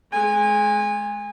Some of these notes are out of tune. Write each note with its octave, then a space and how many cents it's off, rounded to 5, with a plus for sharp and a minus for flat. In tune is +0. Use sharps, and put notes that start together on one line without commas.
G#3 +30 G#5 -25